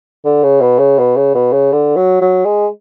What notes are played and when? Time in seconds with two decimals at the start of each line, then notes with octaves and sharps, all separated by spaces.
0.25 D3
0.43 C#3
0.61 B2
0.79 C#3
0.99 B2
1.17 C#3
1.35 B2
1.53 C#3
1.72 D3
1.96 F#3
2.21 F#3
2.45 G#3